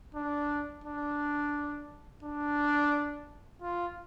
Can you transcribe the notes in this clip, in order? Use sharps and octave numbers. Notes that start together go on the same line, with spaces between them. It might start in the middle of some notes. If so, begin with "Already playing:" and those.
D4
D4
D4
F4